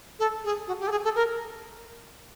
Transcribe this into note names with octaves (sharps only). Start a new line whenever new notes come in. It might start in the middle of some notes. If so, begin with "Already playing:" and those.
A4
G#4
F#4
G4
A4
G#4
A4
A#4